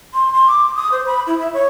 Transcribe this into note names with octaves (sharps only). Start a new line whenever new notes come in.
C6
C6
D6
D#6
C5
B5
E4
E5
C#5